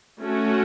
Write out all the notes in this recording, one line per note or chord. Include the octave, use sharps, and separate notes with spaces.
A3 C#4 F#4